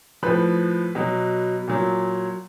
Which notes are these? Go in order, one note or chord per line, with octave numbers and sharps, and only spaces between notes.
A2 F3 B4
B2 F#3
A#2 F#3